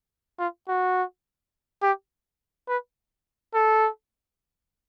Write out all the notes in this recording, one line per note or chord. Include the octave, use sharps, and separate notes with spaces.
F4
F#4
G4
B4
A4